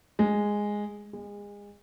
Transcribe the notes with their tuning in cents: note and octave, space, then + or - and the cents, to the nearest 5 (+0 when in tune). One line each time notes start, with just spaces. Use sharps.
G#3 -5
G#3 -30